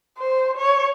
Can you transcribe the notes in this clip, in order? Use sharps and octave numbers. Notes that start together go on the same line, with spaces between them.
C5
C#5